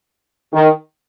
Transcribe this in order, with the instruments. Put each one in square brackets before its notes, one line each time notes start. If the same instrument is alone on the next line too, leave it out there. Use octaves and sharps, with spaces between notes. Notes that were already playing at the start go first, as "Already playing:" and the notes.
[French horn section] D#3